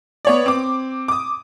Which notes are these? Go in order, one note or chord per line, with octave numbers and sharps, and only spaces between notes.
B3 C#5 D5
C4 D6
D6 D#6